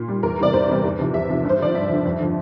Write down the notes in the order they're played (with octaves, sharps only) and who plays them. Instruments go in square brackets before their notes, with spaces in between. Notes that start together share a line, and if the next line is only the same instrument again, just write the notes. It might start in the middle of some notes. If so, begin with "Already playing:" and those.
Already playing: [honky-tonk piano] A#2
G3
E2 A#4
C3 E3 G3 D5
E2 C5
C3 E3 G3
E2
C3 F3
E2 E5
C3 F3
G2 C5
D3 F3 D5
G2 E5
D3 F3
F2
D3 F3